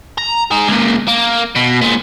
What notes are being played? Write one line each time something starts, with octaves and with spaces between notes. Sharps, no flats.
A#5
D#4 G#4
C#2 A#2
A#3
B2
A#2 G#3